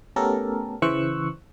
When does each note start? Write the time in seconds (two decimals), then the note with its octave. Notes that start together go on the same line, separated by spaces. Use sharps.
0.16 A3 B3 C#4 G4 A4 A#4
0.82 C#3 E3 C5 C#6 E6 F#6